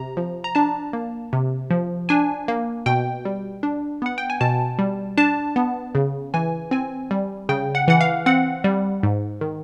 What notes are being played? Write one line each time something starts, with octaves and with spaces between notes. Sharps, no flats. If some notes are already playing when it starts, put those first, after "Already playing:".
Already playing: C3 A#5
F3
A#5
D4 A5
A#3
C3
F3
D4 G#5
A#3
B2 G5
G3
D4
B3 F#5
G5
G#5
B2 A5
G3
D4 A5
B3
C#3
E3 G#5
C4 G#5
G3
C#3 G5
F#5
E3 F#5
F5
C4 F#5
G3
G#2
D#3